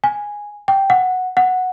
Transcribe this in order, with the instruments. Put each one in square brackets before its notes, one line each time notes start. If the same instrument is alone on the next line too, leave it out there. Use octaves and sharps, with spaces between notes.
[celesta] G#5
G5
F#5
F#5